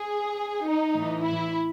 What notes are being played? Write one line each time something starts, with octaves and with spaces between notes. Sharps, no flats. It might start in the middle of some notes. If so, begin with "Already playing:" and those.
Already playing: G#4
D#4
A2 E3
E4